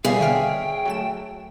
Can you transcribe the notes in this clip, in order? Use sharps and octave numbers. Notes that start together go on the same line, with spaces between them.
B2 G3 G#4 C#5 E5 F5
D3 G5 F6
F#3 A3 E7